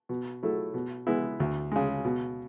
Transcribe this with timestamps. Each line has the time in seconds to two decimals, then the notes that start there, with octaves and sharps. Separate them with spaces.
0.09 B2
0.43 F#3 A3 E4 A4
0.74 B2
1.07 G#3 B3 E4
1.40 D2
1.72 C#3 G#3
2.05 B2